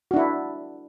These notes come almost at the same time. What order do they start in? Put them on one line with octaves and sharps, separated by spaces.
F#4 D4 E4